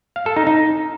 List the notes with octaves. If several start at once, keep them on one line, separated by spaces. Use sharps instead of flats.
F5
A4
D#4
D#4